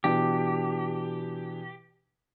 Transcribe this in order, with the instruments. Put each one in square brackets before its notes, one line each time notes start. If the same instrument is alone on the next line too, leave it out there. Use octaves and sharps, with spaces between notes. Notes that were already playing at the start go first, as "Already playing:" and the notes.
[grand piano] B2 E3 D4 [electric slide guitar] G4